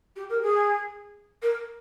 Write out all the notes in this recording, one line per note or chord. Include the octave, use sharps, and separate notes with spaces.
G4
A#4
G#4
A#4